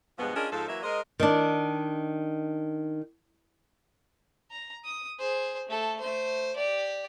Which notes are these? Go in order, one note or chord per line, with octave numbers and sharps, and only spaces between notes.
G2 B2 F3 G#3 B3
C#4 D4 F4 G#4 A#4 D#5
G#2 F3 F4 A4
E3 F#3 A#3 E5
G#3 A#4 C5 D#5
D#3 D4
A#5
D#6
G#4 C5
A3 A4
A3 C5
G4 D5